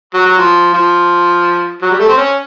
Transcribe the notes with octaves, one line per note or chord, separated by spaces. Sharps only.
F#3
F#3
F3
F3
F#3
G3
A3
C4
C#4